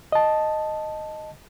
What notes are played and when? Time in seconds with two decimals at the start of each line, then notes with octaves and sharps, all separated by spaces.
0.12 D#5 A5